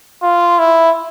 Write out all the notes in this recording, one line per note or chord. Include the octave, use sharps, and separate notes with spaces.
F4
E4